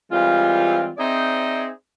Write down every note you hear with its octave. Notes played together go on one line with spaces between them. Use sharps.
E3 G3 G#3 C4 F4
C4 D#4 G#4 C5 D5 E5